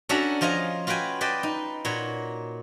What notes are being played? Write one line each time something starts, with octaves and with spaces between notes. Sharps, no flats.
C#4 D4 F#4 A4 E5 A#5
F3 F4 D#5 G#5 A#5
F4 F#4 B4 G5 G#5
B4 D5 D#5 G5 A5
D#4
A#2 F#4 C#5